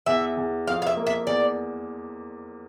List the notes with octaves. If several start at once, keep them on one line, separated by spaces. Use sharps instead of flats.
E2 E5
E2
F2 F5
F5
E5
A#3
E5
E2 D5